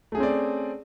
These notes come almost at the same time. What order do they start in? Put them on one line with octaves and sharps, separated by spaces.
A3 G#4 C#4 C4 D5